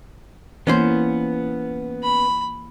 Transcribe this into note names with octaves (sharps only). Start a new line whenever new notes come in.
E3 A#3 B3 C#4 C5
B5